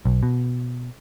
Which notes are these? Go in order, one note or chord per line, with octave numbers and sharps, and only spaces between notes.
B1
B2